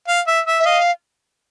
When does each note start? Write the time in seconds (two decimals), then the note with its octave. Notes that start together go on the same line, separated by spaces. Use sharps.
0.08 F5
0.27 E5
0.46 E5
0.60 E5
0.65 D#5 F5